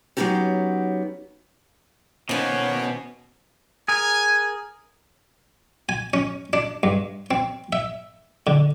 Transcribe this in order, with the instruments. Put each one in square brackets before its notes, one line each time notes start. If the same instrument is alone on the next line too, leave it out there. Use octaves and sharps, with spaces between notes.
[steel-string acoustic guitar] F#3 G3 B3 C#4 D#4 G4
[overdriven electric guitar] B2 B3 [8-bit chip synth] D#3 A#3 [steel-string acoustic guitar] C#4 C5 [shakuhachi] C#5
[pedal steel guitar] G#4 A#4 [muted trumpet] G#5
[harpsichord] G#5
C#4
D4
G2
C4
E5
D3